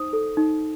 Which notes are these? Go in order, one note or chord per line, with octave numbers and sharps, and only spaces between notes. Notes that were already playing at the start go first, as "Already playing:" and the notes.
Already playing: D#4 C5 D#6
A4
D#4